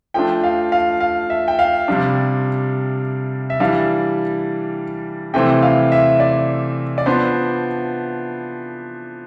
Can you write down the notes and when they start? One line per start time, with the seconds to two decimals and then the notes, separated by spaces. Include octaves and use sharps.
0.14 F3 A3 D4 G5
0.44 F5
0.72 F5
1.00 F5
1.30 E5
1.48 G5
1.59 F5
1.88 C3 G3 D4
3.50 E5
3.60 E3 G3 D4 F5
5.34 C3 E3 A3 C4 E4 G5
5.62 F5
5.92 E5
6.20 D5
6.98 D5
7.06 F3 B3 D4 C5